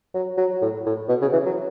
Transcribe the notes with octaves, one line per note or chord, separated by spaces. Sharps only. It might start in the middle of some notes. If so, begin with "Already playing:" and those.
F#3
F#3
A2
A2
B2
C#3
E3
F#3